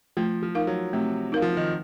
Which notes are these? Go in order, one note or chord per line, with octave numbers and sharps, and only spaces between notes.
F3 A3
F3
D#4 A#4 F5
F#3
C3 A3
D#4 A#4 F5
F3
D#3